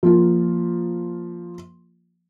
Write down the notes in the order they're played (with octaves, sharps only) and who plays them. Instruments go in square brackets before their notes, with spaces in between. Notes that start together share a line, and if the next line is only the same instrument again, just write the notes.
[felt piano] F3 A#3 F4